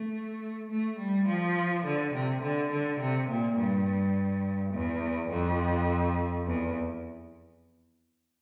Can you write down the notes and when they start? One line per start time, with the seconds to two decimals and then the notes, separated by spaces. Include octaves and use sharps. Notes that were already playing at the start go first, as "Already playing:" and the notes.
Already playing: A3
0.70 A3
0.99 G3
1.28 F3
1.85 D3
2.14 C3
2.42 D3
2.71 D3
3.00 C3
3.29 A#2
3.58 G2
4.74 E2
5.31 F2
6.47 E2